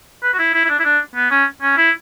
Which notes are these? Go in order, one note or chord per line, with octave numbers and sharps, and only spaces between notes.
B4
F#4
E4
E4
E4
D4
E4
D4
B3
C#4
C#4
E4